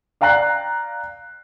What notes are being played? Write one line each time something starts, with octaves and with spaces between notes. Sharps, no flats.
D5 F5 G5 A#5 F#6 C7